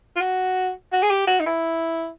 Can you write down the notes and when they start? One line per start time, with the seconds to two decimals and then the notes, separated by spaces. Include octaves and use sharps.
0.16 F4
0.21 F#4
0.93 F#4
1.03 G#4
1.10 G4
1.27 F#4
1.40 D#4
1.46 E4